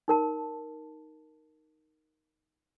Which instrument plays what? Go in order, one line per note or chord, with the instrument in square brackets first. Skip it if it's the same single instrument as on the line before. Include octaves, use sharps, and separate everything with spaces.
[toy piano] D#4 A#4 A5